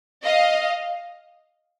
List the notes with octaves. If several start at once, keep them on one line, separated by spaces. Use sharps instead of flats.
D#5 F5